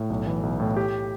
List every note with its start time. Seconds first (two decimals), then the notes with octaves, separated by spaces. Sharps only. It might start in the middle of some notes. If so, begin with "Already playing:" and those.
Already playing: A2
0.10 B1
0.26 E3
0.43 B1
0.60 A2
0.77 G4